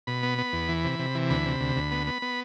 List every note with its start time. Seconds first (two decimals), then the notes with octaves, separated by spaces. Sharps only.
0.07 B2 B5
0.23 B3
0.38 B3
0.53 E2
0.69 E3
0.84 C3
0.99 C3
1.15 E3
1.30 D2 B5
1.45 C3
1.60 D2
1.76 D2
1.92 B3
2.07 B3
2.22 B3